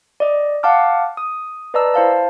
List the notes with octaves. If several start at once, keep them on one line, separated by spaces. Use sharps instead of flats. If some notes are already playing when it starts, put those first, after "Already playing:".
D5 D#5
F5 F#5 A5 D6 F6
D#6
B4 D5 D#5 A5 A#5 E6
E4 C5 F5 A5